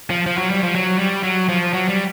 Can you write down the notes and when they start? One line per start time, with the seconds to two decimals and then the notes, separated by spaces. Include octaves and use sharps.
0.10 F3
0.26 F3
0.38 F#3
0.50 G3
0.63 F3
0.75 F#3
0.99 G3
1.23 F#3
1.49 F3
1.73 F#3
1.88 G3